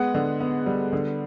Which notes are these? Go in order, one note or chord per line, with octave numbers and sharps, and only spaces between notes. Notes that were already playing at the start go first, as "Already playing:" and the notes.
Already playing: G#3 B3 F#5
D3
B3
G3
D3